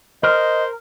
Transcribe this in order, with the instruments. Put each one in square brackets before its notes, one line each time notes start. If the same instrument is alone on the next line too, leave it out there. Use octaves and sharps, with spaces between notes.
[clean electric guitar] A#4 [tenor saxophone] C5 [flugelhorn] D#5